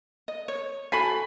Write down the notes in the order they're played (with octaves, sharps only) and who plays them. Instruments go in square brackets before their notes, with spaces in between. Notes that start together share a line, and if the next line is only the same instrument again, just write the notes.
[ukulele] D#5
C#5
[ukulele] F#4 A4 G#5 [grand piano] B5 B6 C7